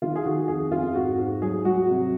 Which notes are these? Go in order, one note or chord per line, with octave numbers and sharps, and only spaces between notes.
D#3 F4
G#4
D#3 F#4
F2 G#4
F2 F4
G#2 F#4
G#2
F#3 G#4
F#3 F#4
C3